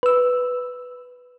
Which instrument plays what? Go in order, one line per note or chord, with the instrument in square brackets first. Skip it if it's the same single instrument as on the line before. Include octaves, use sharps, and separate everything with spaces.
[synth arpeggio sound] B4 E6